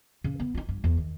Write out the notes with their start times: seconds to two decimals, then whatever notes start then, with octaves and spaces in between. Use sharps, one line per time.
0.24 C#3
0.40 B3
0.54 D#4 F4
0.69 G2
0.84 E2
0.97 D#3